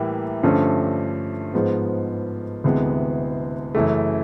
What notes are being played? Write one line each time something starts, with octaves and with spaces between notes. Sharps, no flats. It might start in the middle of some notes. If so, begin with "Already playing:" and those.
Already playing: A2 E3 G3 A#3
G2 D3 F3 A3 C#4
G#2 F3 G#3 B3
D2 C3 E3 G#3 B3
F#2 C#3 E3 A3